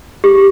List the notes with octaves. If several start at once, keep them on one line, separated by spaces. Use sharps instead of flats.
G4